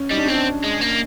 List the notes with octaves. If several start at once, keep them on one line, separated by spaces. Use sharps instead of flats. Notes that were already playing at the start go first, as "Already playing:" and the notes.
Already playing: C#4
G3 D#4
D4
C#4
C4
D4
G#3
A#3